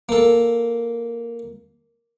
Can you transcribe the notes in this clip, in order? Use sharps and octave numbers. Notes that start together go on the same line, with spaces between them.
A#3 A4